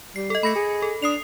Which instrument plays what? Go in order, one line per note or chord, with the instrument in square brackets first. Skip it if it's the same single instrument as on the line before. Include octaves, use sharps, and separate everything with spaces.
[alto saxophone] G3 [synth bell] C7
[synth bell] A4 D#5
[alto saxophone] A3 [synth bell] B5 A#6 C#7
[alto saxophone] G#4
[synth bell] A4
[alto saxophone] D4 [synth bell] D#6 C7 F7